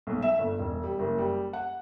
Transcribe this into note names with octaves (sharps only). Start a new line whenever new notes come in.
B1
E5
G1
E1
G3
F#1
G3
F#5